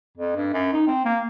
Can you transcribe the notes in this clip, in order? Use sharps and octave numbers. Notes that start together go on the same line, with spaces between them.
F2
G2
F#2
D#4
C4
A#3